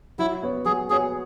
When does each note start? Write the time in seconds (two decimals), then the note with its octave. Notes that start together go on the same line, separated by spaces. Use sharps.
0.19 F#3 E4
0.43 B3 F#4 C#5
0.65 F#3 G#4
0.89 B3 F#4 G#4 C#5